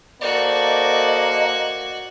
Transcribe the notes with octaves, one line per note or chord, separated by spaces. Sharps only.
A#3 F#4 A4 C5 D5 D#5